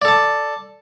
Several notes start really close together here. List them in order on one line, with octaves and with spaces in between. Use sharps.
D5 A4 A5